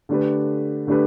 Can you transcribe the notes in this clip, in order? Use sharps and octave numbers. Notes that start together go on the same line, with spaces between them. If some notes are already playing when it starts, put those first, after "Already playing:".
D3 A3 D4 G4 B4
D3 A3 D4 G4 B4